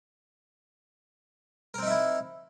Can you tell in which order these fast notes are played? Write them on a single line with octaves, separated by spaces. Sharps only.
A#4 C4 D#4 E5 E4